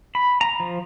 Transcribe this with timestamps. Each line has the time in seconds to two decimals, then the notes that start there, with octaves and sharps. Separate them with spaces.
0.15 B5
0.41 A#5
0.60 F3